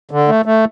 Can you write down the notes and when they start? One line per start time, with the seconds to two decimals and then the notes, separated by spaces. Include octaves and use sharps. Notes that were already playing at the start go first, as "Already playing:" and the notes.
0.11 D3
0.28 A3
0.46 A3